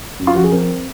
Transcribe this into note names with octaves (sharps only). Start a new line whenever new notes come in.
F#2
F4
F3 F#4
G#4
C4 A#4